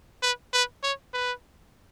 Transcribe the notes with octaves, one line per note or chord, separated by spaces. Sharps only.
B4
B4
C#5
B4